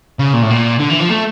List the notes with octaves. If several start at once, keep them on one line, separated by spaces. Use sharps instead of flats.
C#3
A#2
A2
A#2
D3
E3
F3
A3